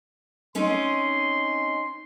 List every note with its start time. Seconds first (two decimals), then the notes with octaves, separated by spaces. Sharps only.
0.55 C4 C#4 D#4 C6